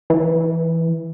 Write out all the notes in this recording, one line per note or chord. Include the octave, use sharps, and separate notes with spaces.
E3